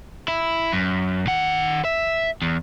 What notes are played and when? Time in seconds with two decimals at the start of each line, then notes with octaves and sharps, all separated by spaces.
0.28 E4
0.73 F#2
1.27 D#3 F#5
1.85 E5
2.42 E2